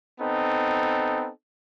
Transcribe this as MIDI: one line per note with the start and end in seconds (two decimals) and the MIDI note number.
0.20 1.29 59
0.20 1.29 60
0.20 1.29 63
0.20 1.29 69